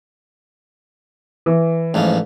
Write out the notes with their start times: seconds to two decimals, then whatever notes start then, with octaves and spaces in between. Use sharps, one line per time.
1.46 E3
1.94 A1 G#2 F3